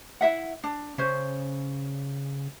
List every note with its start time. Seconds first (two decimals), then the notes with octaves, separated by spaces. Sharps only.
0.21 E4 E5 F#5
0.64 D4
0.98 C#3 C#4 C5